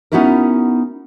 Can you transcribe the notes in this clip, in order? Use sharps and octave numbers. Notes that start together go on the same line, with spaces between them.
B3 C#4 D#4 E4 F#4 A#4